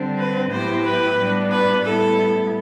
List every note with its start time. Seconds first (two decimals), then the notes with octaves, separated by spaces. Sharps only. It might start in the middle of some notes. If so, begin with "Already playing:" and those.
Already playing: D3 G3 C4
0.19 B4
0.51 A2 F#3 B3 E4 G4 C5
0.85 B4
1.18 A2 G3 B3 D4
1.51 B4
1.84 A2 G3 B3 E4 A4